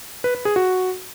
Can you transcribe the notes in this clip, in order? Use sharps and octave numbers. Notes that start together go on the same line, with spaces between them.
B4
B4
G#4
F#4